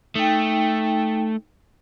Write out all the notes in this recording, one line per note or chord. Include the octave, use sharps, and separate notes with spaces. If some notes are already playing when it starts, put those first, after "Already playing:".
A3 D#4 G5